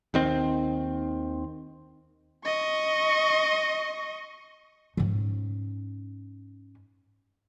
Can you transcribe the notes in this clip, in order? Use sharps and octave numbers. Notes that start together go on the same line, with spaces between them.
D#2 D#3 C4
D#5 C#6
G#2 C#4